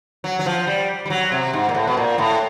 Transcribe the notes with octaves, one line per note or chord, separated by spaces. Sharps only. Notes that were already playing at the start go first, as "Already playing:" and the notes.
F#3
F#3
F3
G3
G3
F#3
C3
G#2
A#2
A2
B2
A#2
A2